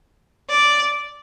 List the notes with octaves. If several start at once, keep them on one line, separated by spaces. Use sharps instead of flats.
D5